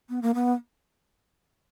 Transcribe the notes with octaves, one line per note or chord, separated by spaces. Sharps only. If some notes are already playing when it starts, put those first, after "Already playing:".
B3
A#3
B3